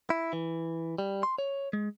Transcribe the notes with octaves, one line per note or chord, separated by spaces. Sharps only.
E4
E3
G3
C6
C#5
G#3